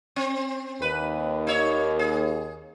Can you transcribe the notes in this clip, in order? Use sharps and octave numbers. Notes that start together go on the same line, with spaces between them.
C4
D#2 B4
D#4 C#5
G#4